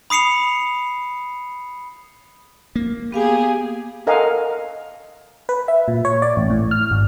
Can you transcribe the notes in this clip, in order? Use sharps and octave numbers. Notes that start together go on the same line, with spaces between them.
B5 D#6 C7 C#7 F7
A#3
B3 G4 G#4 F5 G#5
A4 A#4 D#5 F5 F#5 G#5
B4
E5
A#2
C#5
D5
A1
A2
F6
G#1